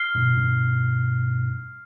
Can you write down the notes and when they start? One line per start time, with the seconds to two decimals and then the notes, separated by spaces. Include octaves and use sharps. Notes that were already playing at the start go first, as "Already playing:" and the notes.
Already playing: F6 C7 G7
0.14 G2 B2
0.36 G2 B2